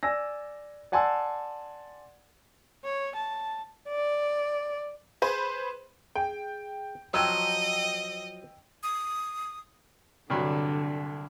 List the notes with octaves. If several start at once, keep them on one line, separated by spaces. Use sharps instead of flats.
D5 G#5 E6 A#6
D5 F#5 G#5 A5 C6 E6
C#5
A5
D5
G#4 B4 C5
G#4 G5
F3 F#3 D#5 G5 E6
D#6
C2 G2 D3 F#3